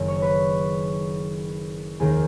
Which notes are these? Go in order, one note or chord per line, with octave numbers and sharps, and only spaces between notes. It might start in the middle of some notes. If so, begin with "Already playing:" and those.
Already playing: F#1 F#2 D#3
C#5
B4
F1 D#2 D#3 A#3 G#4